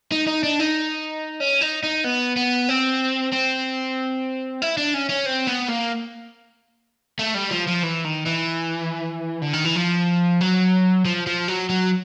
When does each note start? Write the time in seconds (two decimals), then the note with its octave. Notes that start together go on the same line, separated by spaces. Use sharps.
0.12 D#4
0.27 D#4
0.44 D4
0.60 D#4
1.40 C#4
1.61 D#4
1.83 D#4
2.04 B3
2.36 B3
2.69 C4
3.33 C4
4.62 E4
4.77 D4
4.94 C#4
5.10 C#4
5.26 C4
5.47 B3
5.69 A#3
7.19 A3
7.34 G3
7.51 F3
7.68 F3
7.83 E3
8.05 D#3
8.26 E3
9.42 D3
9.54 D#3
9.65 E3
9.76 F3
10.41 F#3
11.05 F3
11.27 F3
11.48 F#3
11.69 F#3